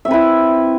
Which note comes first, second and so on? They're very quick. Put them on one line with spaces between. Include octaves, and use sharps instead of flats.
E5 C4 B4 E4